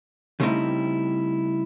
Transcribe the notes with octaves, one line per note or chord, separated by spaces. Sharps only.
C#3 G3 A3 C4 D#4 E4